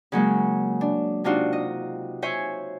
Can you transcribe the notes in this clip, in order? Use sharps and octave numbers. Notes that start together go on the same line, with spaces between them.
C#3 F#3 G#3 A#3
D4
C3 D4 D#4 F4 F#4
D#5
C5 C#5 E5 G#5